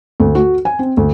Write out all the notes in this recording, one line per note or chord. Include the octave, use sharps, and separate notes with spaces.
D2
F#4
G#5
C4
D2